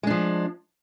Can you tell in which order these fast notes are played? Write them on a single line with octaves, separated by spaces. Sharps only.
G#3 D4 F3